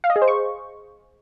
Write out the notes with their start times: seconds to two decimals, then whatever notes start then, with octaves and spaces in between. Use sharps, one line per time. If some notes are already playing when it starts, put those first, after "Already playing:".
0.04 F5
0.10 D#5
0.16 G#4
0.22 C5
0.28 C#6